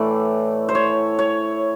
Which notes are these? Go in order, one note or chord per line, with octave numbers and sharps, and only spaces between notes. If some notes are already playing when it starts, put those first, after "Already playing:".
Already playing: A2 E3 A3 D5
C5
C#5
C#5